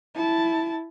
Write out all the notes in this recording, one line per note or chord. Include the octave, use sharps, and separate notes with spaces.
E4 A5